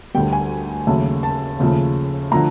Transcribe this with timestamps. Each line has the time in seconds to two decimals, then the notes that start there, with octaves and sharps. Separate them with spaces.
0.14 D2 D3 G3 G5
0.33 G#5
0.87 D#2 C#3 F#3 A3
1.23 A5
1.59 D#2 C#3 F3 A3
2.31 D3 F3 A3 A#5